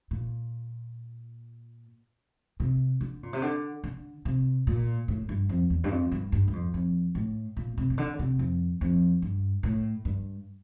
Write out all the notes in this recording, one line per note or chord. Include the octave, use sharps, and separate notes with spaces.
A#2
C3
D3
A#2
C3
D3
D3
C3
A#2
A2
G2
F2
E2
G2
F2
G2
G2
G2
F2
F2
A2
A#2
C3
C3
D3
C3
F2
F2
G2
A2
G2